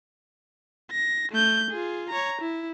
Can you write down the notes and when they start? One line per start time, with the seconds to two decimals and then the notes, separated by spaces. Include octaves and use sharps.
0.91 A#6
1.31 A3 G6
1.71 F4 G#4
2.09 C#5 A#5
2.41 E4